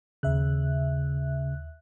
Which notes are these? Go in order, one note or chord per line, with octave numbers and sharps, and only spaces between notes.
D#2 C#3 E5 F#6